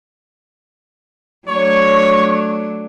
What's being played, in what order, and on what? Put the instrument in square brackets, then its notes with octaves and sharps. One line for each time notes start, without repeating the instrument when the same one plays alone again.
[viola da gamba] F#3 A3 D4 [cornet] C#5 [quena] C#6